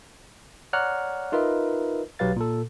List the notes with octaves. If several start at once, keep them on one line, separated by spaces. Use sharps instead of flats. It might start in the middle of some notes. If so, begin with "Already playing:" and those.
C#5 D5 F#5 A#5 F6 F#6
D#4 F4 A#4 B4 D#5 E5
B1 F#3 G4 B4 F5 A6
A#2 A4